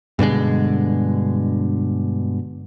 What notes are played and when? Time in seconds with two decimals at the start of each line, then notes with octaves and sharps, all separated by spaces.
0.19 G2 B2 D3 G#3